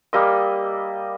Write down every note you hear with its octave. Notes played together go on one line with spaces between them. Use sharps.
G3 A#3 D#5 E6